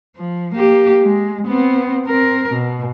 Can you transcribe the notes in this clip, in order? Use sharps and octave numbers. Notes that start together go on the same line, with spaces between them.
F3
A#3 G4
G#3
B3 C4
C4 A#4
B2